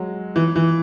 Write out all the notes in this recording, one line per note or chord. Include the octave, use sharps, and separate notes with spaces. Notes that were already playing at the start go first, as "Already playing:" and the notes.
Already playing: F#3 G#3
E3
E3